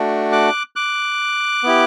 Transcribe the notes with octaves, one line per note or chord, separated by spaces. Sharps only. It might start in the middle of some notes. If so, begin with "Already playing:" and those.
Already playing: A3 D4 F#4
D6 F#6
D6 F#6
B3 E4 G4